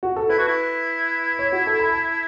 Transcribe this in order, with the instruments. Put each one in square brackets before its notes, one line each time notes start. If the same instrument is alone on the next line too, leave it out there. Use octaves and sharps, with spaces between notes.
[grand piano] F#4
A4
[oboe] E4 [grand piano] B4
[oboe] F#4
E4
[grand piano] C#5
F#4
A4
B5
A5